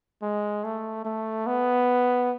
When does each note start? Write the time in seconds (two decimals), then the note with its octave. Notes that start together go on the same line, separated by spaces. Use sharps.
0.22 G#3
0.64 A3
1.05 A3
1.47 B3